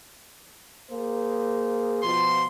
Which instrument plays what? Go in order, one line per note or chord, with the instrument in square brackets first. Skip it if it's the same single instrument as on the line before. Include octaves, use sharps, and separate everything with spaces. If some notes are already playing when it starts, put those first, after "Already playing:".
[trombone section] A#3 G#4 C5
[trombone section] B2 F3 [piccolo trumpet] C6